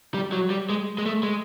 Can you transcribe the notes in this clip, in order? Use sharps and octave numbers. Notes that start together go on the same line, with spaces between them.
G3
F#3
G3
G#3
G#3
A3
G#3